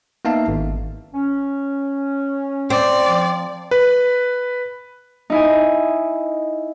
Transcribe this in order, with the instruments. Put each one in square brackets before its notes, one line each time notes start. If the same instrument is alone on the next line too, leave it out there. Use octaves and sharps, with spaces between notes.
[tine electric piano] A#3 B3 D#4 E5 F5 A5
G#1
[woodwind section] C#4
[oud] C4 [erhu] D5
[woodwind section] F3
[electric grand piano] B4
[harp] D#4 E4 G#5